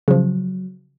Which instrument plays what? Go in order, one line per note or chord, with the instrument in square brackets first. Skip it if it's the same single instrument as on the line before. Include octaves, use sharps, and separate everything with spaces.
[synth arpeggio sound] C#3 F3 [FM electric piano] F#3